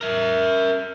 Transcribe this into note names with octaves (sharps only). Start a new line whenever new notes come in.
A#4 E5